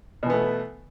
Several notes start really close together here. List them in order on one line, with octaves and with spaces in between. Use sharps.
B2 E3 B3 A3